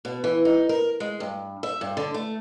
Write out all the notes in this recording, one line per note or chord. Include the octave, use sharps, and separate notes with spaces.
B2
E3
D#4
A#4
G#3
G2
E5
G2
D3
A3